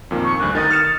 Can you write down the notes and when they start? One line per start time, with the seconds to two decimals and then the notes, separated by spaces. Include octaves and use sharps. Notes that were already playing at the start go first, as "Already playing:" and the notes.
0.11 F2 A#2 D#3
0.24 C#6
0.40 D2 G2 F#6
0.55 D#3 D#4 D#6 A6
0.70 F6 C#7 E7